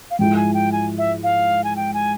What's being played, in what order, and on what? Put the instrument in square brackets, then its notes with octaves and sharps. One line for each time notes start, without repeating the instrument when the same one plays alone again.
[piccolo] F5
[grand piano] G#2 F3 G#3 E4 [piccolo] G5
[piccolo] G#5
G5
G#5
E5
F5
G#5
G5
G#5